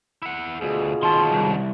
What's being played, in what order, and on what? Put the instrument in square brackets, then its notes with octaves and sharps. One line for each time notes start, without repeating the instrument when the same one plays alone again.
[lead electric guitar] E4 F#5
[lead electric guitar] D2 [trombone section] B2 F4 G#4
[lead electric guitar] D#3 C#4 [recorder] A5 [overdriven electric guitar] C6
[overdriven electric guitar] C2